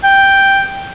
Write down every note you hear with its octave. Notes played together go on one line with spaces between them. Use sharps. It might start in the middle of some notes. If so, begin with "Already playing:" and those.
G5